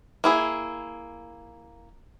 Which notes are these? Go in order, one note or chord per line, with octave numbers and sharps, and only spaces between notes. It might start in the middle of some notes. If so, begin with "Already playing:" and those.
A#3 E4 G#4